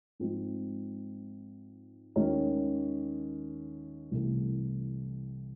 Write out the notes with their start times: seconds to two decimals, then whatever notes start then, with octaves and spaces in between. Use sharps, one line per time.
0.20 G#2 F3 G#3 C4
2.16 D#2 D#3 G#3 C#4
4.11 C2 C3 E3 A3